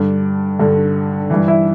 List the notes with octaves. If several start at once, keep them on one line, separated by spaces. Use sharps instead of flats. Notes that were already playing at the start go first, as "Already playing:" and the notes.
Already playing: G2 D3 D4 D5
G2 D3
G2 E3
E4 E5